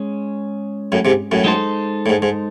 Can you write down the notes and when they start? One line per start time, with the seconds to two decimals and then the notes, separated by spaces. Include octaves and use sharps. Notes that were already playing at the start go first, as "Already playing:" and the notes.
Already playing: G#3 C#4 C#5
0.92 F#2 A2
1.05 G#2 C3
1.32 F#2 A2
1.44 G#3 D#4 A4 C5
2.06 A2
2.09 G#2
2.22 G#2